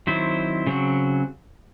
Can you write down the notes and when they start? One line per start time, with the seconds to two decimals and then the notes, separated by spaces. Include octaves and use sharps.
0.07 D#3 F#3 C4 E4 C5
0.67 C#3 F#3 C4 F#4